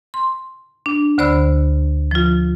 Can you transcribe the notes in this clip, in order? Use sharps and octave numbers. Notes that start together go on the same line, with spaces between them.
C6
D4
D2 D3 C5 D5 B5 E6
F3 F4